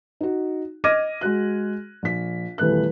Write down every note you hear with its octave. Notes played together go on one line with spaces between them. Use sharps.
D#4 F#4
D#5 D6 F6 G#6 A#6 D#7
G#3 F#4 F#6
A#1 B6
D#1 E2 A3 B4 F#6